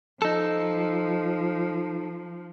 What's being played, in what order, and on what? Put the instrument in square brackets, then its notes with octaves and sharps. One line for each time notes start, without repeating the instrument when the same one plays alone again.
[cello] F3 [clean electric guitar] D#4 A4